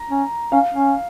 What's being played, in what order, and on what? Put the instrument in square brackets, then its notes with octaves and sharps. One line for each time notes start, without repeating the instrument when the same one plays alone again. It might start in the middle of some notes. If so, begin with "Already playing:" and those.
Already playing: [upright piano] A#5
[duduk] C#4
[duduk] C#4 [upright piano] F5
[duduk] C#4